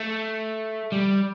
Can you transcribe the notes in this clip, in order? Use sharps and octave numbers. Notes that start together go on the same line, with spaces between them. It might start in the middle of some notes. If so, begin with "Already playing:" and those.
Already playing: A3
G3